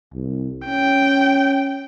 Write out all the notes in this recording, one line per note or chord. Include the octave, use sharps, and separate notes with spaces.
C2
C#4 G5